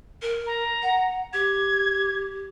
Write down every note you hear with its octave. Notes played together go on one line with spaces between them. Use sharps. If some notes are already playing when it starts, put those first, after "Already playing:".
A#4
A#5
F#5
G4 G#6